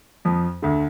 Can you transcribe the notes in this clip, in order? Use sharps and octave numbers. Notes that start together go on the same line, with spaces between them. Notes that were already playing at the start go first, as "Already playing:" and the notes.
F2 F3
D2 D3